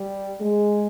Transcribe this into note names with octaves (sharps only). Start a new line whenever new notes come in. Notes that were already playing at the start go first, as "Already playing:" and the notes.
Already playing: G3 G4
G#3 G#4